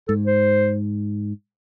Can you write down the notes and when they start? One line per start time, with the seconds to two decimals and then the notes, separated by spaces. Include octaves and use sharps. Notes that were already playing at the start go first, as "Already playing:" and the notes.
0.08 G#2 A4
0.27 C5